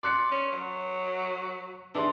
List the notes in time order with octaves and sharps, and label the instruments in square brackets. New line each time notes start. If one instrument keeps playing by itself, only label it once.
[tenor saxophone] D5 [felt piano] C6 F#6 C#7
[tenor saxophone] C#4
F#3
[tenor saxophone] E3 [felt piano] D4 G#4 C6